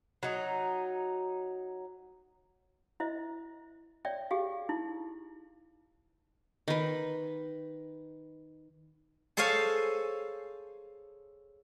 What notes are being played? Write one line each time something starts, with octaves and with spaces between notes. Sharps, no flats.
F#3 D#4
E4 C5 D#5 E5
C#5 D5 E5 G5
G4 G#4 F5
D#4 E4
D#3 B4
G#4 A4 C5 C#5 F5 G#5